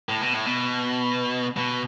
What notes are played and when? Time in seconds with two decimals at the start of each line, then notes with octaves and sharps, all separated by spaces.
0.09 A2
0.21 B2
0.33 A2
0.46 B2
1.57 B2